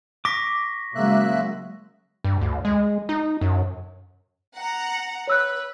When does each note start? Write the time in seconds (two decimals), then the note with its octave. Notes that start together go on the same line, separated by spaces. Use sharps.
0.25 C#6 D6 A#6 B6
0.95 C#3 F#3 G#3 A#3 E5 F#6
2.24 G2
2.41 D2
2.65 G#3
3.09 D#4
3.41 F#2
4.54 F#5 A#5
5.27 B4 C#5 E6 F#6